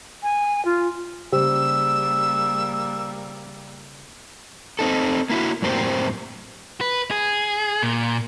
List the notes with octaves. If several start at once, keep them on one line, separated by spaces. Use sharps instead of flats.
G#5
F4
C#3 G3 A#3 G4 C5 E6
C4 D#4 A4
A#3 E4 F#4
F#2 A2 A#3 C4 G4 C5
B4
G#4
A#2